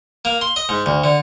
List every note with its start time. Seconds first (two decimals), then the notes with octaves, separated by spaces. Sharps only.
0.25 A#3
0.41 C6
0.56 D#5
0.69 G#2
0.86 D2
1.04 D3